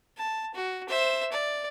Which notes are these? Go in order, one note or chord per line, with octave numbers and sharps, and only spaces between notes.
A5
F#4
C5 E5
D5